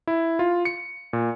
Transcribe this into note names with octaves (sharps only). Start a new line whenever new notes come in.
E4
F4
C#7
A#2